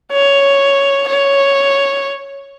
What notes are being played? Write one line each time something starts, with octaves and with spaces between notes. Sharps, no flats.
C#5
C#5